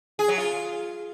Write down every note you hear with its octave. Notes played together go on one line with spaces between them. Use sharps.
G#4
F#3
F4